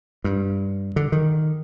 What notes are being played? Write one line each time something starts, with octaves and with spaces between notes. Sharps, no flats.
G2
D3
D#3